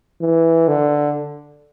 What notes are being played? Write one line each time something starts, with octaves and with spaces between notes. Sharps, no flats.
E3
D3